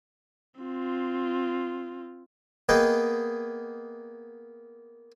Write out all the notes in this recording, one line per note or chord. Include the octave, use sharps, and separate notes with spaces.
C4 F4
A#3 B3 G#4 B4 D#5 G5